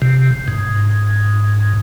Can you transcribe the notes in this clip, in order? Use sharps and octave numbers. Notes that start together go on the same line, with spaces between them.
C3
G#2